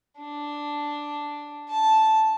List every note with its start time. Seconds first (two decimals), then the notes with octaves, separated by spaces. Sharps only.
0.18 D4
1.69 A5